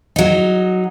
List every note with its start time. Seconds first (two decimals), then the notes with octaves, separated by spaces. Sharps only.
0.16 F#3 D#4